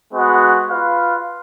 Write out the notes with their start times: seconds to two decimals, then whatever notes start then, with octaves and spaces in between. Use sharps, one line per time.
0.11 G#3 B3 F#4
0.69 F4 B4 F5